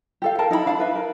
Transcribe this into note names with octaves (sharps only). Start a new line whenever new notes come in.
G4 A4 F5
A4 A#4 A5
D#4 E4 F5 B5
D4 F5 A5 B5
A4 B4 E5
A#4